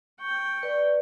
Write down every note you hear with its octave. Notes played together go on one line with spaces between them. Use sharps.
G5 C#6
B4 D5